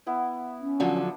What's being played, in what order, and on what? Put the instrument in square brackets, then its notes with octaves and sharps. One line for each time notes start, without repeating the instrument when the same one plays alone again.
[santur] B3 E4
[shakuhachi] C#4
[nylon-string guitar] D3 F3 F#3
[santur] D4